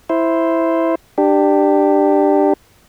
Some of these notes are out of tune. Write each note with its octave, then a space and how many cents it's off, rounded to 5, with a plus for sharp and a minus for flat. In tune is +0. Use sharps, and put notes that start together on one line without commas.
E4 +0 C5 +0
D4 +20 G4 +0